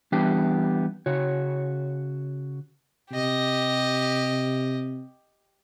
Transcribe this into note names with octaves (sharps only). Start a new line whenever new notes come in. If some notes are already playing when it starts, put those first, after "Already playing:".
E3 G3 B3 D4 G4
C#3 F#4 C#5
C3 G4 D#5